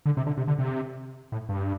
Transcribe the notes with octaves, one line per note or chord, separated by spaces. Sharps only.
D3
C3
D3
C3
D3
C3
A2
G2